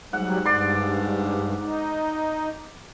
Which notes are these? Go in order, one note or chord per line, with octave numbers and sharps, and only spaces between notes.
G#2 F#3 G3 F#5
G2 D5 C6
D#4